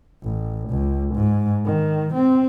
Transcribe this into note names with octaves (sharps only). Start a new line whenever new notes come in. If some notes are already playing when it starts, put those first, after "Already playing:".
A1
C#2
G#2
D#3
C4